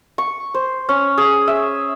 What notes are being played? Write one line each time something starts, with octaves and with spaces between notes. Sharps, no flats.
C#6
C5
C#4
G#4
E5